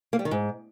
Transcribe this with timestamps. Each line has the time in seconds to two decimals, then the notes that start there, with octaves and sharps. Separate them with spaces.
0.13 A#3
0.19 G3
0.25 D#3
0.31 G#2